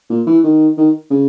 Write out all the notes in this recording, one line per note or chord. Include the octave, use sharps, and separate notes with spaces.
A#2
E3
D#3
D#3
C#3